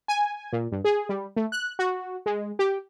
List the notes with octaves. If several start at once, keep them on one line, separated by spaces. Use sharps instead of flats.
G#5
A#2
G2
G#4
G3
A3
F#6
F#4
G#3
G4